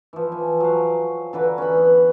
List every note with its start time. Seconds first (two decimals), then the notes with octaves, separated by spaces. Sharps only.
0.13 E3 F3
0.32 G#5
0.60 F#3 F5
1.33 D3 E3 B4 A#5
1.58 C#4 B4 B5
1.77 B3